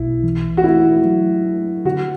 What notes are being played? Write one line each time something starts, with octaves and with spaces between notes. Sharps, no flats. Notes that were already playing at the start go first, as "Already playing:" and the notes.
Already playing: B1 E4
E3
F#4
D4 E4
F#3
D4
D3 F#4